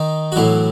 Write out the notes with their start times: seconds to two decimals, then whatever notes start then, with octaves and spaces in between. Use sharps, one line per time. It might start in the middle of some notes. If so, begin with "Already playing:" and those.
Already playing: D#3 D#4
0.32 F#4
0.36 A2 E3 F#3 E4